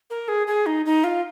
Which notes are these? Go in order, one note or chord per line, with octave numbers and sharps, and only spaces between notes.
A#4
G#4
G#4
D#4
D#4
F4